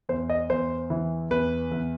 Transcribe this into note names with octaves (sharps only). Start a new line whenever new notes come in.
E2 C5
D#5
E2 C5
E3
E2 B4
E2